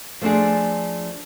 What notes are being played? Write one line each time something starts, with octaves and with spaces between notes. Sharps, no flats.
F3 A3 C4 D4 G#4